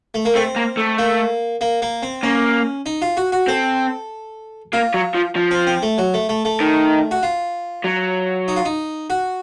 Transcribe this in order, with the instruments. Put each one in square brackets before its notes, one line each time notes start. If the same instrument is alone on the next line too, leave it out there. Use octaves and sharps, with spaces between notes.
[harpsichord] A3
A#3
[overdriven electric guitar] A3 [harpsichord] C4
[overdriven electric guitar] A#3
A3
[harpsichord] A#3
A#3
A#3
C4
[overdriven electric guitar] A#3 [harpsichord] C#4
[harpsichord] D#4
F4
F#4
F#4
[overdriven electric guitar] C4 [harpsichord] A4
[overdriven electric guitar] A#3 [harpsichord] F4
[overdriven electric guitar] F#3
F3
F3
[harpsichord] C4
C4
A3
F#3
A3
A3
A3
[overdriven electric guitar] D#3
[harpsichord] F#4
F4
[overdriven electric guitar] F#3
[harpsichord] D#4
F4
D#4
F#4